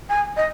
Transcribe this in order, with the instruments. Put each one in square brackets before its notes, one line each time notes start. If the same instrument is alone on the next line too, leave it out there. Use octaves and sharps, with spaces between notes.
[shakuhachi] G#5
D#5